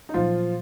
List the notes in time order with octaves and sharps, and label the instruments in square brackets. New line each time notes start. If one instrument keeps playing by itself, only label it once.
[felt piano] D#4
[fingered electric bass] A#2 F#3 A#3 [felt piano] F3 F4